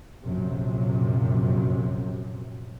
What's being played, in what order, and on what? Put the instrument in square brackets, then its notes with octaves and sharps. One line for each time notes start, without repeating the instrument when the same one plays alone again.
[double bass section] A#1 F#2 C3